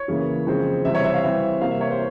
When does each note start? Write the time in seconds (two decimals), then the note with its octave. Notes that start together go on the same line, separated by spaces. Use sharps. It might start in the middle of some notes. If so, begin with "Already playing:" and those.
Already playing: C#5
0.08 C#3 E3 A#3
0.47 C#3 F3 G#3 C4
0.85 C3 E3 G3 C4 E5
0.94 C#5
1.04 E5
1.14 F5
1.23 E3 G3 C4 E5
1.61 C3 G3 A#3 F5
1.71 E5
1.81 C#5
1.91 C5